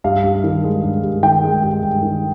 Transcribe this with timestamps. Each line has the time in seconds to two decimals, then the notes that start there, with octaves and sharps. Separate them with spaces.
0.04 G2 F5
0.24 G2
0.44 D#3
0.64 G#3
0.84 G2
1.03 G2
1.23 D#3 G5
1.44 G#3
1.63 G2
1.83 G2
2.03 D#3